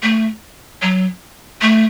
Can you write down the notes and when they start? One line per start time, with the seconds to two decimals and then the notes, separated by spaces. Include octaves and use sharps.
0.03 A3
0.82 F#3
1.62 A3